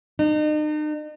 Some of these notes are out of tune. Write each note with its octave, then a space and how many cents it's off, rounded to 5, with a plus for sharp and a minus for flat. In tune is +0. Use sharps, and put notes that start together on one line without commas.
D#4 -40